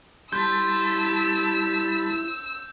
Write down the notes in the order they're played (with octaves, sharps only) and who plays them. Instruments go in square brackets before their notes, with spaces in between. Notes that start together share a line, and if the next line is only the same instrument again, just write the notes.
[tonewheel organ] G3 A5 B5 [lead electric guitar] E4 C6 [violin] E6 [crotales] G6